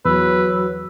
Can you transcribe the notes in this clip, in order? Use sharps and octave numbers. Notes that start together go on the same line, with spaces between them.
E2 F#3 B4 E6